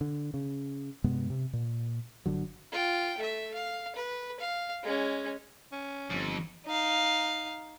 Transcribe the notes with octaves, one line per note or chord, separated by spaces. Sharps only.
D3
C#3
G2 C3 G#3 B3
C3
A#2
G1 D3 F#3
F4 G5
A3 E5
F5
B4
F5
G#3 C#4
C#4
G1 F2
D#4 F5